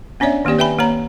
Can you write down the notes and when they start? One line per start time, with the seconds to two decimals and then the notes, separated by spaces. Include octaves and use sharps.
0.20 B3 C#4 D4 C#5 D5 E5
0.45 D#3 A#3 C4 G4 D5
0.59 B4 E5 G5 G#5 B5
0.78 A#3 C#5 A#5